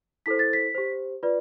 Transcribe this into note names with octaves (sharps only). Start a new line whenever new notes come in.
E4 A4 C5 B6
A6
B6
G4 C5
F4 B4 D5